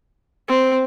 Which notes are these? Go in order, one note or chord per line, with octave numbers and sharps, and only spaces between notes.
C4